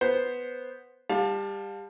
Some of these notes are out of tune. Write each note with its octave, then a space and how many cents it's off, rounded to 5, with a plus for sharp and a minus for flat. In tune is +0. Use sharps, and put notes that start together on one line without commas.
B3 +0 C5 +0
G3 +25 F5 +35 A5 +0